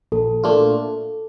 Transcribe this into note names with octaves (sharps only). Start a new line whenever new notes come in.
A#1 A4
A#2 A3 D4 F4